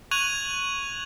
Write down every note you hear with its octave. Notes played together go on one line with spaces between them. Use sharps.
C#6 F#6 G#6 D#7 F7 F#7